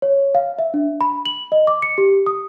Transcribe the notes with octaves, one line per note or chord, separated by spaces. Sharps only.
C#5
F5
E5
D4
B5
F#7
D#5
D6
C#7
G4
D#6